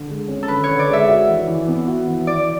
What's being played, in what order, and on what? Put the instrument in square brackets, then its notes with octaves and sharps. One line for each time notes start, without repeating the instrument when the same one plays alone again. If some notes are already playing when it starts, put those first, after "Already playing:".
Already playing: [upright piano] D3
G#3
C#4
[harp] A4
[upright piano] D3 [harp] B4
[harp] C#5
[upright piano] D3
[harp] D5
[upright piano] G#3 [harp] E5
[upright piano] F#4
E3
E3
B3
F#4
E3
[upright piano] E3 [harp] D5